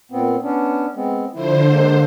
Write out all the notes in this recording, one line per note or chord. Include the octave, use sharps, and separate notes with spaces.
A#2 B3 C4
B3 C#4 D4
G#3 B3 C4
D3 F3 E4 C5
G#3 A#3